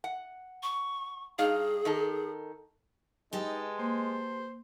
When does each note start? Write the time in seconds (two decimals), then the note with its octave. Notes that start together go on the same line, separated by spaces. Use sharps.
0.04 F#5
0.63 C#6
1.38 G2 D#4 G#4 F5
1.85 D#3 D#4 A4
3.33 G#3 D#4 G4 A4 B4
3.79 A#3 C5